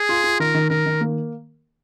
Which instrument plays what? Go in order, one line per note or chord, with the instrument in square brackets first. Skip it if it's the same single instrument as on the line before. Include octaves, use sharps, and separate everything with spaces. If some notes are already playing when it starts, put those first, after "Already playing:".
Already playing: [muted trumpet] G#4
[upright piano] F4
F4
[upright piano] D#3 [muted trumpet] A#4
[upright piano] D#3
[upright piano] D#3 [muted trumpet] A#4
[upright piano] D#3
A#3